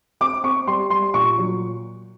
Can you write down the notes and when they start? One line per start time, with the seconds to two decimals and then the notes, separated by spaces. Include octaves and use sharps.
0.21 C4 D6
0.44 C4 C#6
0.67 G3 C6
0.90 G3 C6
1.14 A#2 C#6
1.38 F#3